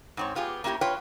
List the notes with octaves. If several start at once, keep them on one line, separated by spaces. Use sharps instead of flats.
G#2 C4 C#5
B3 F4 G4 G#4
A#3 C#4 E4 F#4 G4 A#4
F4 B4 C#5 G5